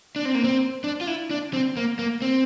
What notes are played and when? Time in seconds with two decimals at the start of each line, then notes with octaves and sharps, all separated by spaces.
0.16 D4
0.25 C4
0.35 A#3
0.44 C4
0.84 D4
1.01 F4
1.07 E4
1.31 D4
1.53 C4
1.77 A#3
1.99 A#3
2.22 C4